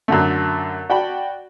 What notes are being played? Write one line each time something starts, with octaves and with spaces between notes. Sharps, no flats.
F#2 D3 A3
F#4 D5 G5 A5 B5